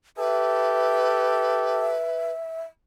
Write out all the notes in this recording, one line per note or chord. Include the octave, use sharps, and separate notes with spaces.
G4 A4 B4 E5